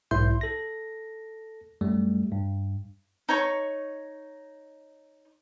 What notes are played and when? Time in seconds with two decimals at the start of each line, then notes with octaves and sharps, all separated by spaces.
0.11 B1 G#2 E4 E5 C6 G6
0.41 A4 A#6
1.81 F#2 G3 A3
2.32 G2
3.29 D#4 C#5 C#6